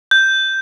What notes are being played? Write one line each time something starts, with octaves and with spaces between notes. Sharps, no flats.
G6